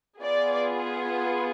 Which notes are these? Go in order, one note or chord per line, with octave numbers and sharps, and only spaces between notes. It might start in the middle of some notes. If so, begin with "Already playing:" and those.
B3 F4 G#4 D5